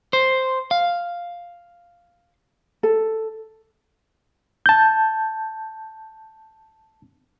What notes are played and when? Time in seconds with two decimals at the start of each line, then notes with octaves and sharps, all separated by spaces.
0.13 C5
0.71 F5
2.83 A4
4.66 A5 G6